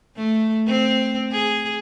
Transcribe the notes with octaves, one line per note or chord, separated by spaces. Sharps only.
A3
C4
G#4